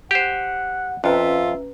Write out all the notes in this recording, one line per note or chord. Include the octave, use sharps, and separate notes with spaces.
G4 C5 F#5
F2 C#4 F4 B4 E5 A#5